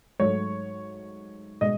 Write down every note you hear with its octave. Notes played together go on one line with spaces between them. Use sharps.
G#2 F#3 A3 C#5
B2 G#3 D#5